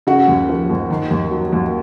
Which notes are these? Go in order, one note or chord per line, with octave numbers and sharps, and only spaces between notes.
C#3 F#4
D#2
F3
D#2
D#3
D#2
F#3
D#2